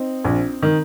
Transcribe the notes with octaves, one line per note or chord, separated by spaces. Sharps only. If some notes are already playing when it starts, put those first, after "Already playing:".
Already playing: C4 D#4
A#1
D#3